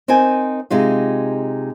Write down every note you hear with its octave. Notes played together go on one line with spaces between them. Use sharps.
C4 D#4 A#4 C5 G#5
C3 G#3 D#4 F4